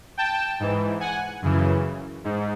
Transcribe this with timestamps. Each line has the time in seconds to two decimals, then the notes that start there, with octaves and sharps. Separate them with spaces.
0.17 G5 A5
0.60 G#2 E3
1.00 F#5 G#5
1.42 F#2 C#3 E3
2.24 G#2